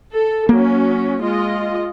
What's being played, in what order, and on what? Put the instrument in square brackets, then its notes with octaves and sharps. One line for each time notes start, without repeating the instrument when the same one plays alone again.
[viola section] A4
[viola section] F#3 C#4 [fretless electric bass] A#3
[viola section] G#3 F4 D#5